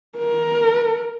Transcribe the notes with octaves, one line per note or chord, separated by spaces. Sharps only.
A#4